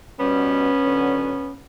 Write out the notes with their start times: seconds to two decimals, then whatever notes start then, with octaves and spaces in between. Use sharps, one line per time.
0.19 B2 G3 B3 C#4
0.83 D3 F#3